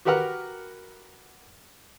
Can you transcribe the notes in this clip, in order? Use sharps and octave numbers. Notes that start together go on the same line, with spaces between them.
F#4 G4 A#4 B4 F#5 F6